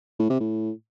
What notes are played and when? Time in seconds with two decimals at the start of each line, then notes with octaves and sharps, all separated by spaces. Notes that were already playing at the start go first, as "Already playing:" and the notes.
0.20 A2
0.30 C3
0.40 A2